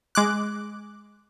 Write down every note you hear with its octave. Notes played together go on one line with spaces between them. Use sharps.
G#3 D6 F#6